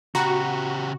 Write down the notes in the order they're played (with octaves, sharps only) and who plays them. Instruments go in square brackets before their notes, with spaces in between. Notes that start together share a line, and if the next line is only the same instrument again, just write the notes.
[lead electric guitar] C#3 G4 [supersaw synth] F#4 [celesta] A#5 B5